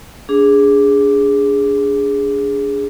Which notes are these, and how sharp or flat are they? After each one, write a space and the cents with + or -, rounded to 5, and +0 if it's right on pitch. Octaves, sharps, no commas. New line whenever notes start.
D4 -30 G#4 -10 D6 +0